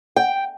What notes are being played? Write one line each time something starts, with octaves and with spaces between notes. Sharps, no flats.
G5